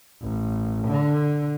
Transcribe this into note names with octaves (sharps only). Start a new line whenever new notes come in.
A1
D3